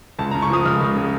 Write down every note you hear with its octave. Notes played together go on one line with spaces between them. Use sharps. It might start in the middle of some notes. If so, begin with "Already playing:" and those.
C#2 A5
C#3 A#5
C#6
F3 D#6
C#2 F6
C#2
C#3